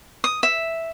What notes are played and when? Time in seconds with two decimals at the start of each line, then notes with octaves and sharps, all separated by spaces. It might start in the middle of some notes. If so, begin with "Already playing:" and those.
0.24 D#6
0.43 E5